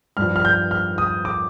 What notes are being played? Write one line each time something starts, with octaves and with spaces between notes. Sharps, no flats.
G2 F3 F6
F6
G6
F6
D#6
D6